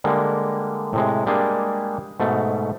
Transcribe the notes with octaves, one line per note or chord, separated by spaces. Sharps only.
D3 G3 G#3 A#3
A2 C3 G#3
G3 G#3 A#3 D4 G#4
G#2 B2 A3